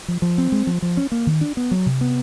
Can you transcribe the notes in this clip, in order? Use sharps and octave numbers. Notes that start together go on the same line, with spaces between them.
F3
F3
C4
G#3
F3
F3
C#4
A#3
D#3
D4
B3
F#3
C3
B3